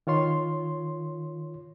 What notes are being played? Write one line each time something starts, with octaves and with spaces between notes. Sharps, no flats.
D#3 F4 C#5 C6